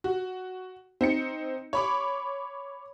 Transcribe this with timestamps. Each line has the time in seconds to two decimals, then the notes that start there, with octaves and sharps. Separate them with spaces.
0.04 F#4
1.01 C4 D#4 C#7
1.73 C#5 B5 D6